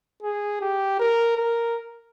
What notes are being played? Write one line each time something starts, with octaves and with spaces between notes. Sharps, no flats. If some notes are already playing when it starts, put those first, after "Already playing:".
G#4
G4
A#4
A#4